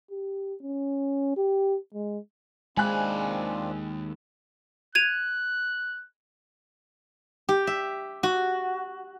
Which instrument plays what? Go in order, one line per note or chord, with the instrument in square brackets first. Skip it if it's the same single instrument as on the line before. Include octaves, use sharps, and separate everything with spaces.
[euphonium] G4
C#4
G4
G#3
[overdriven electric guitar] D#2 B5 [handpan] G#3 [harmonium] C4 D4 F4 [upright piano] G#5 F#6
[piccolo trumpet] F#6 [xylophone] G#6 D#7 F7
[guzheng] G4
E5
F#4